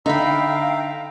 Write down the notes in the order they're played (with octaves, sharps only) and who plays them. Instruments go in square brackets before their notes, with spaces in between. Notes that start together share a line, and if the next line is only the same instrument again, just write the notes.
[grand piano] D3 [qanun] D#4 B5 [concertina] E5 A#5 [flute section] F5 G5